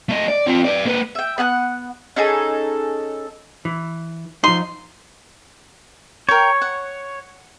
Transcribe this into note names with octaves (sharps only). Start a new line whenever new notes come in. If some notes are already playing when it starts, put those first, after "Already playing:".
A3 D#5
D5
C4 F4
B4 D5
A#3 B4
E5 G5
B3 F#5 A5 F#6
C#4 D#4 G#4 A4
E3
F3 D#4 C6
A#4 C#5 G5
F#5